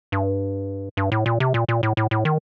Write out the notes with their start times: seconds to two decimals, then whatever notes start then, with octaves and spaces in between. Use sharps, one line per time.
0.12 G2
0.97 G2
1.12 A2
1.26 A#2
1.40 C3
1.54 A#2
1.69 A#2
1.83 A2
1.97 A2
2.11 A2
2.25 D#3